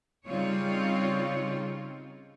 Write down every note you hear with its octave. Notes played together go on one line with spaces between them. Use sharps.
C#3 G3 C4 D#4 F4 C#5